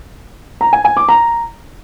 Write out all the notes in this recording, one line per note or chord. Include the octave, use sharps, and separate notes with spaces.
A#5
G#5
G#5
D6
A#5